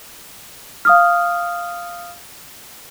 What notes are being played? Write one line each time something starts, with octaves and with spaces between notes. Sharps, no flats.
F5 D#6 F6